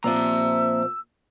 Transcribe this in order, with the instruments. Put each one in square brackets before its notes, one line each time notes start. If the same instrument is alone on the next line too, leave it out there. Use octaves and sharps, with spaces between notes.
[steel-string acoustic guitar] A#2 F3 C4 [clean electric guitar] A#3 [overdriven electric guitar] E5 A#5 [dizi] E6